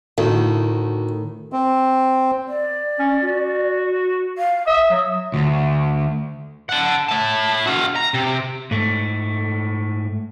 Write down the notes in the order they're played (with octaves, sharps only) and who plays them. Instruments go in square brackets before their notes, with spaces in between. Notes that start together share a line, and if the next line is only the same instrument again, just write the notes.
[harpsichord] D2 [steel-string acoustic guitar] A2 D#3
[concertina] C4
[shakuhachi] D5
[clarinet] C#4
F#4
[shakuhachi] F5
[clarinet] E5 [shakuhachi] D#6
[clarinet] F#3
[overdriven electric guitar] D2
[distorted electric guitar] F#5 A5
E4 A5
F#4 F5
A#5
C3
[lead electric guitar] G#2 A3